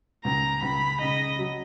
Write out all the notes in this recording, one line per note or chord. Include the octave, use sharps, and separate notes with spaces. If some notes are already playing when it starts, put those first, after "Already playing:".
C#2 A#5
C#2 B5
C#3 D#5
F#3